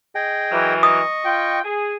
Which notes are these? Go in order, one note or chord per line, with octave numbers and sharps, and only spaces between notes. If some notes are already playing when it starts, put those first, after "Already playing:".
G#4 D#5 G5
E3 F#3 A#4
D#5 C#6 D#6
F4 G5
G#4